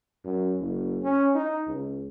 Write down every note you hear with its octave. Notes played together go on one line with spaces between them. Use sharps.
F#2
F#1
C#4
D#4
C#2